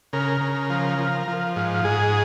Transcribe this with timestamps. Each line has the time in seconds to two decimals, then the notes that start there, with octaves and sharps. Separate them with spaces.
0.13 C#3 A#4
0.41 C#3
0.70 F3
0.99 F3
1.28 F3
1.56 G#2
1.85 G#2 G#4